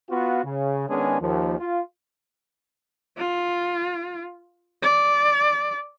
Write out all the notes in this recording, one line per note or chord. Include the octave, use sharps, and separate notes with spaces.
B3 F4 F#4
C#3
D#3 G#3 B3 C#4 D4 G#4
D#2 F3
F4
F4
D5